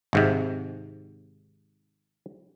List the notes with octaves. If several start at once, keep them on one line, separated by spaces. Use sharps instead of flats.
G#1 G#2 C3